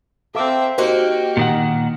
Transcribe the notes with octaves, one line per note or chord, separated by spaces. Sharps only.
C4 A4 E5 F5 D6
A#3 D#4 F#4 G4 C5
A#2 D#3 F#5